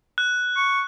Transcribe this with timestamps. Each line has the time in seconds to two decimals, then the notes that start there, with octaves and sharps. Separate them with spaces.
0.18 F#6
0.57 C#6